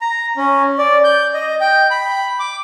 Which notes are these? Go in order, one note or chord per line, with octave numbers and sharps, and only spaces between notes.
A#5
C#4
D5
G6
D#5
G5
B5
D6